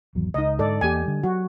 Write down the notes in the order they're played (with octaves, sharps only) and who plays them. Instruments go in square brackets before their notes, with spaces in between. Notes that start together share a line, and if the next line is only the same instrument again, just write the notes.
[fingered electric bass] G#1 E2 F#3
[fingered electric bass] C#2 [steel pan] D#4 D#5
[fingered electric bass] G#2 D3 [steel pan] A4 D5
[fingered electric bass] E2 A#3 [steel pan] G4 G#5
[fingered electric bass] D3 G3
[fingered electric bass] F#3 [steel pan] F#4